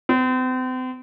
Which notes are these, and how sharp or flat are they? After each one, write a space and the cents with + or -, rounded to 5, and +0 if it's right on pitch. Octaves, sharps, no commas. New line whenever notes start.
C4 -40